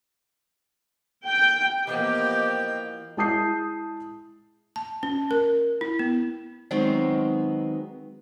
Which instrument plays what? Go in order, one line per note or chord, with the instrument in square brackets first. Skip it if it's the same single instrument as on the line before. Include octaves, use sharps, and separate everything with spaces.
[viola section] G5
[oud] E3 F3 B3 [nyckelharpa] A#3 G5 [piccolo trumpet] G4 [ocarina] D#5
[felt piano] G#3 E4 A5 D#6 G6 C7
[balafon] A5
C#4
A#4
E4
B3
[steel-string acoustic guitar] D#3 F#3 G#3 B3 C4